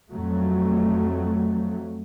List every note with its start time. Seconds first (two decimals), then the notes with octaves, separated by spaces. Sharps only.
0.13 F2 F#3 A3